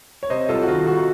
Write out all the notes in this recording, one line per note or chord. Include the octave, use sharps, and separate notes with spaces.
C#5
C3 C5 D#5
C2 F4 A4
F#4
D#3 F4
C2 F#4